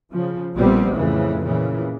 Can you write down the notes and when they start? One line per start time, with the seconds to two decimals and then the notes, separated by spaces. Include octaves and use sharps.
0.11 C#3 F3
0.56 A#1 G3 B3 C4
0.94 F2 A2 C#3 E3
1.43 A#2 C#3 E3